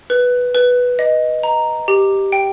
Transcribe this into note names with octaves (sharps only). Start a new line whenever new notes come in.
B4
B4
D#5
A#5
G4
G5